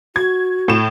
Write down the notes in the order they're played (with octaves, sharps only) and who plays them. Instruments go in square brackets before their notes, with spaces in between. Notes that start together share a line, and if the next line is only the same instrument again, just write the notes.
[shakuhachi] F#4 [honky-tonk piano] G#6
[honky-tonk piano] A2 E7